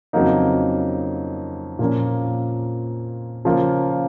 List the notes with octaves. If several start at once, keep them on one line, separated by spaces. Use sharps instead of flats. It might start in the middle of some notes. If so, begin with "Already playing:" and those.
F2 C#3 F#3 A#3 D#4
A#2 F3 A#3 C#4
C#3 F3 A#3 F4